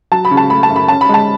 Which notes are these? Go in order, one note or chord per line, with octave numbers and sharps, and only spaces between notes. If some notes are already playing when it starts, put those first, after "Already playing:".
F#3 A5
B5
C#3
A5
A3 B5
A5
F#2
B5
C#4 A5
B5
G#3 A5